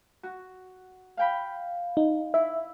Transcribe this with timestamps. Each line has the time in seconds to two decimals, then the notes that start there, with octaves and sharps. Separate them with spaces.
0.23 F#4
1.17 F5 G5 B5
1.97 D#4
2.34 E4 E5